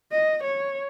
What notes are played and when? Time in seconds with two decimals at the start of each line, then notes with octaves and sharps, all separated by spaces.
0.12 D#5
0.43 C#5